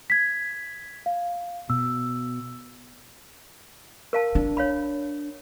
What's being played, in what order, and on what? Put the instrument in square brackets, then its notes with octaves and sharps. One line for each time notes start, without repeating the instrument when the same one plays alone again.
[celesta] G#6 B6
F5
[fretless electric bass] B2 [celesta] E6
[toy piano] A#4 F5 A5
[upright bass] D4
[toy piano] C#5 F5 B5